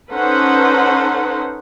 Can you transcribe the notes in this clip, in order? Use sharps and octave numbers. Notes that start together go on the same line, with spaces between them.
C#4 D#4 A4 B4 C5 F#5